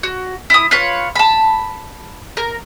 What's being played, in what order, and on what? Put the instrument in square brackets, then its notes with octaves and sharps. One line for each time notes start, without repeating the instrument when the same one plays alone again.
[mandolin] F#4
E4 D#6
F4 B4 C#5
A5 B5
A#4